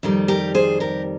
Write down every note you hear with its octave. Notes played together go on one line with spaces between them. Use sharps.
F2 D#3 G3
G4 A#4
G#4 C5
G4 A#4